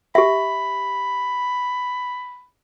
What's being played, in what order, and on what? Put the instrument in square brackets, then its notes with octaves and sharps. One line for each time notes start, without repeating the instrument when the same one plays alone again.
[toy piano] G4 E5 [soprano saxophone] B5